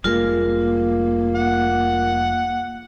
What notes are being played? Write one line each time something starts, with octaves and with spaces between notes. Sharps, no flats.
F1 G3 G#3 A#3 F4 A#4
F#5